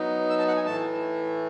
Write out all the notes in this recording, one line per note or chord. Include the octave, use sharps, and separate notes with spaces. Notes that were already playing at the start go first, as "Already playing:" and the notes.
Already playing: F#3 B3 D#4
E6
A5
F#5
G#5
A2 E3 A3 A5